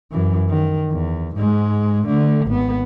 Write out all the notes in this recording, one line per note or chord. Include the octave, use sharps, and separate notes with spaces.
F#2 E3
D#3
E2
G#2 G#3
D3 A3
G#1 B3